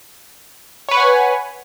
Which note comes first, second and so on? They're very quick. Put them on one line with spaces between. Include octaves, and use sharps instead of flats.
C#5 B4 C#6 F#5 G#5